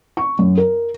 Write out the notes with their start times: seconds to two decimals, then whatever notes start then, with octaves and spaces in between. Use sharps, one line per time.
0.17 C#6
0.39 F#2
0.57 A#4